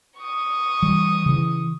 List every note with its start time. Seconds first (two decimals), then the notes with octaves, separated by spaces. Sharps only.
0.19 C#6 D#6
0.82 E3 G3
1.26 C#3 E3